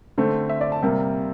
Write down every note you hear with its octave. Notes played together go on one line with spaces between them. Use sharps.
D3 A3 C4
E5
D5
A5
C3 G3 A#3